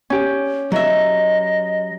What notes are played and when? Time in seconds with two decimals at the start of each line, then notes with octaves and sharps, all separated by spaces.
0.10 C#4 G4
0.72 F#3 D#5 E5